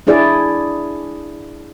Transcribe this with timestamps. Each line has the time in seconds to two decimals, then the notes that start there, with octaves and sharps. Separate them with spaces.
0.07 D4 E4 G#4 D5